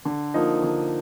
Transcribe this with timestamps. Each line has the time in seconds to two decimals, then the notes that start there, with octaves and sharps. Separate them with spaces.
0.05 D3
0.34 F3 A#3 D#4
0.63 D3